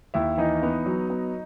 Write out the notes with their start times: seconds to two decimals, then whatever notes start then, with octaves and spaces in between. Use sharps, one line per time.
0.14 D#2 E4 E5
0.38 E3 D#4 D#5
0.63 B3
0.86 F#3
1.10 B3